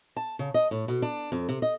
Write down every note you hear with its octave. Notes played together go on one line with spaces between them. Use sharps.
A5
C#3
D#5
A2
B2
D4
F2
C3
D#5